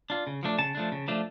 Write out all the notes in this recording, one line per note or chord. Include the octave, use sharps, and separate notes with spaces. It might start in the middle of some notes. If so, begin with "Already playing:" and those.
D4 F4
C#3
F3 A3 D4
C#3 A5
F3 A3 D4
C#3
F3 A3 D4